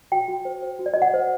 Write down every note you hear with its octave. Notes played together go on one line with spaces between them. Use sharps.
F#4 G5
F#4
C5
C5
F#4
D5
F#4 D#5
F#5
C5